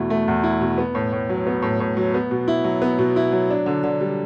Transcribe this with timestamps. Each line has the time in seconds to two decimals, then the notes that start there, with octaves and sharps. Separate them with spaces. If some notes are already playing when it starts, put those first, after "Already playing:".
Already playing: E2 B2 A3 E4
0.10 A3
0.28 E2
0.43 E4
0.61 B2
0.78 B3
0.95 A2
1.12 A2
1.29 F#3
1.47 B3
1.62 A2
1.80 A2
1.97 F#3
2.14 B3
2.31 B2
2.48 E4
2.64 F#3
2.82 B3
2.99 B2
3.16 E4
3.32 F#3
3.50 D4
3.66 D3
3.84 D3
4.00 G3